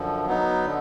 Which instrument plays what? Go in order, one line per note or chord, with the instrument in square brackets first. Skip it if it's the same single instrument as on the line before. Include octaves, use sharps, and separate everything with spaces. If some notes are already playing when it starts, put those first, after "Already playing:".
Already playing: [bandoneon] F#2 D3 F3
F#3 B3 D#4
D3